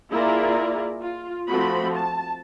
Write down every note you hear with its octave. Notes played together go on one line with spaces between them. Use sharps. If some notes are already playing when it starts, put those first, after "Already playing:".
A#3 E4 F4 G#4 A#4 D5
F4
F3 A3 C4 F#4 B5
A5